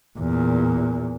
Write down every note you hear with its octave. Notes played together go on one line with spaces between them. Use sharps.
E2 A#2